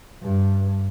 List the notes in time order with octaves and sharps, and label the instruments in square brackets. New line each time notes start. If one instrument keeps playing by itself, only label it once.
[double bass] G2